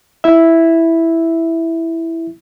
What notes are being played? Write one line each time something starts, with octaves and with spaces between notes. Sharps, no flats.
E4 E5